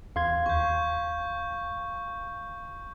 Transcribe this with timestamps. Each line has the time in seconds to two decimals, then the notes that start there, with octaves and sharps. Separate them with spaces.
0.16 E2 F5 C6 G#6
0.46 D#2 C#6 G6